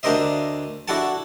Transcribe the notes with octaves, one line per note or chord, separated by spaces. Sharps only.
D2 D4 A#4 C5 D#5 E5
D4 E4 F#4 A4 F#5 A5